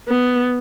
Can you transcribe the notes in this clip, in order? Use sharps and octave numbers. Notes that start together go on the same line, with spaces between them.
B3